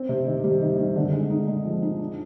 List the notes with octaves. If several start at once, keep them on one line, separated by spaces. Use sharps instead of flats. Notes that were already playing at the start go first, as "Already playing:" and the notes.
Already playing: C4
C3
D#3
G3
D#3
D#3
D3
G#3
D#4
G#3
F3
D#4
D4